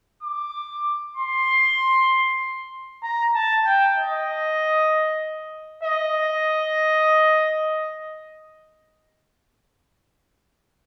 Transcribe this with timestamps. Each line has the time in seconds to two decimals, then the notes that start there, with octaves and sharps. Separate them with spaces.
0.23 D6
1.16 C6
3.03 A#5
3.35 A5
3.66 G5
3.97 D#5
5.84 D#5